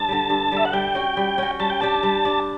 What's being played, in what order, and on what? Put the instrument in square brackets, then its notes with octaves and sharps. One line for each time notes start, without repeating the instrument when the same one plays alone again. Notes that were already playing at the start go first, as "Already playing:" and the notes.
Already playing: [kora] G2 [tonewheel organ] A5
[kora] D3 G3
G2
[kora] D3 G3 [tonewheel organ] E5
[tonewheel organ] F#5
[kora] G3 [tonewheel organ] G5
[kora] C#4 F#4
G3
C#4 F#4
[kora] G3 [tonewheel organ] A5
[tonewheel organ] G5
[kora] D4 G4 [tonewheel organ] A5
[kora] G3
D4 G4